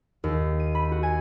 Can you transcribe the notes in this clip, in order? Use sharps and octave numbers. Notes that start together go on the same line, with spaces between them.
D#2
D#7
B5
F#4
G#5